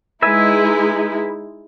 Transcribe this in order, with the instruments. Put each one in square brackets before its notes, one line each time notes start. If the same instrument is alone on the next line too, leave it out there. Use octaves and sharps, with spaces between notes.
[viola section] G#3 D#4 E4 [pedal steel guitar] B4 E5 G#5